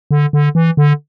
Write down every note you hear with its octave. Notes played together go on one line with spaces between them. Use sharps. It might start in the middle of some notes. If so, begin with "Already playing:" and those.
D3
D3
E3
D3